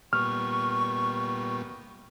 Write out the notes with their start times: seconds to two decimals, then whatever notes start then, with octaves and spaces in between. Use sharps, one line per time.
0.13 A#2 G3 B3 C#6 F6